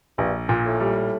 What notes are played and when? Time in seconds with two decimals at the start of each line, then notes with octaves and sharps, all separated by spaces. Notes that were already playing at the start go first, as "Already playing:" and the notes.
0.18 A#1 G2
0.49 A#2
0.65 A2
0.80 G3